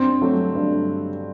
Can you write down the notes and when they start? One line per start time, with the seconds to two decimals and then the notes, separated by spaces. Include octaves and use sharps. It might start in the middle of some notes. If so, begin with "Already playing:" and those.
Already playing: G2 C4
0.21 F#3 A3
0.55 G2